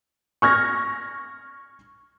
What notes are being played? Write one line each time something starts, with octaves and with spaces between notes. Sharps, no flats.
C#6 F6 G#6 A#6